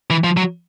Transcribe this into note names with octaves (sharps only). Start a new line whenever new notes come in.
E3
F3
F#3